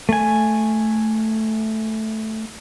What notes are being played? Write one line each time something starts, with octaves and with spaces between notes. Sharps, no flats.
A3 G#5